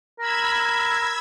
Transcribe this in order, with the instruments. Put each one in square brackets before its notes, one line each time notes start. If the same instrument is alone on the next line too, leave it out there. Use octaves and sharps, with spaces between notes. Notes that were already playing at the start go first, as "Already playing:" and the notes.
[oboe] A#4 [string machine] B5 E6 G#6